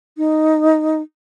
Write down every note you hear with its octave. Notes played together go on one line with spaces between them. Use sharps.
D#4